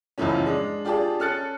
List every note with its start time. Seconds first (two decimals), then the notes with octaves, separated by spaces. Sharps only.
0.18 C#2 F#2 A2 E3 F3 C#4
0.46 G#3 D4
0.85 D4 F4 G4 G#4 D5 A5
1.20 C#4 A4 F6 F#6 A6 C#7